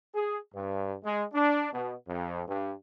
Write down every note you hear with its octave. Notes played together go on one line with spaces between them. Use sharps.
G#4
G2
G#3
D4
B2
F2
G2